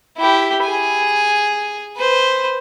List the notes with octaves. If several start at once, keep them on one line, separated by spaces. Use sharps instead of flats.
E4 G4
G#4 G#5
B4 C5